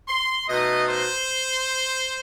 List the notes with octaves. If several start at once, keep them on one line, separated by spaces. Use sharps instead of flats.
C6
B2 A3 D#4 D#5
C5